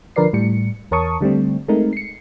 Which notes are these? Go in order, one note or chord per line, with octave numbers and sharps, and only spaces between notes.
D3 F3 A#4 B4 D5 C7
A2 G3 C#7
E2 A#4 C#5 A5 C#6 D#6
D3 G3 A3 C4
G#3 A3 C4 D#4 A#4
C7 C#7